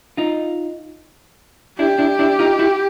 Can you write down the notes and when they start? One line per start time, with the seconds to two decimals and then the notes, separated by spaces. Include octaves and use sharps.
0.17 D#4 F4
1.78 D4 E4 G4
1.98 D4 E4
2.19 D4 E4
2.39 D#4 F4
2.59 E4 F#4